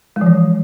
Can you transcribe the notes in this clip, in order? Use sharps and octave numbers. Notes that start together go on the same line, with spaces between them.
G#3
F3
E3